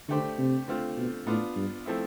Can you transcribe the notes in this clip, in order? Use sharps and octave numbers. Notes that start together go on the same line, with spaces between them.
D3 A3 D4 G4 C5
C3
D3 A3 C4 F4
B2
A2 B3 D4 F4
G2
F3 A3 C4 E4